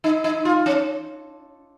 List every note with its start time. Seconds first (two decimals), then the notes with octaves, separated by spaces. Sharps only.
0.04 D#4
0.24 D#4
0.45 F4
0.66 C#4